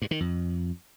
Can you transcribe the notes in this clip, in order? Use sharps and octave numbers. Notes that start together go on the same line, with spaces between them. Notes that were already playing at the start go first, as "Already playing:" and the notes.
G2
D#3
F2